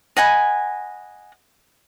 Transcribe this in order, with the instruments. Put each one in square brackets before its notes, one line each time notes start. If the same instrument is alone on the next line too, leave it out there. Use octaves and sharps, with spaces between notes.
[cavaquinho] D#5 F#5 G#5 B5